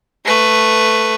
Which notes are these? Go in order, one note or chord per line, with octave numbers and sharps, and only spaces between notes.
A3 B4